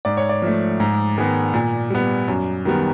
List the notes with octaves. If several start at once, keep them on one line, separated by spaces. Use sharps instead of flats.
G#2 D5
C#5
D5
F3 A3
G#2
D#3 G#3 B3
A#2
G3 B3
F#2
D#3 G3 B3